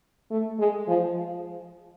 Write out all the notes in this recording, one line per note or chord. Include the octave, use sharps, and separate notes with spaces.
A3
G#3
F3